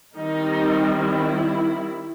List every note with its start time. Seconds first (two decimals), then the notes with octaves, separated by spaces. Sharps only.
0.17 D#3 G3 C4 D#4
0.99 E4